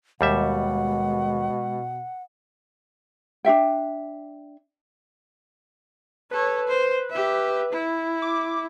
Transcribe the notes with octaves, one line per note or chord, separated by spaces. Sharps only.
D#2 B2 G3 G#3 E5 F#5
D4 F#4 E5 G5
A4 B4 C#5
C5
G4 E5
E4
D6